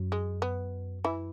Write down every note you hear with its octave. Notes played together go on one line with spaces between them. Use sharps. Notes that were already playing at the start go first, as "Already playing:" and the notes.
Already playing: F#2 F#3
G#3
B3
E3 E4